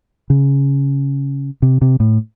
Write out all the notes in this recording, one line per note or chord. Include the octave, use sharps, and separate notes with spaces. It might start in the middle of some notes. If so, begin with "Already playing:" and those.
C#3
C3
C3
A2